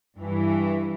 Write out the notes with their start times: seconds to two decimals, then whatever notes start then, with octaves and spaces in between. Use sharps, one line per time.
0.19 G2 E3